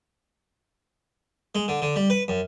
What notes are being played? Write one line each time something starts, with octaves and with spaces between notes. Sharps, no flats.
G#3
D3
D3
G3
B4
F#2